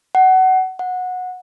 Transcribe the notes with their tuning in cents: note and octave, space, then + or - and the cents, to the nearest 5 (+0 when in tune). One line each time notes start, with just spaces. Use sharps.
F#5 +20
F#5 -20